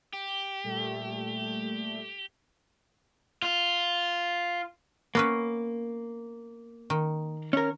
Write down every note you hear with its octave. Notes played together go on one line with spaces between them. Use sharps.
G4
A#2 G3 A3
F4
A#3 B3 C#4 B4
D#3
C#4 A#4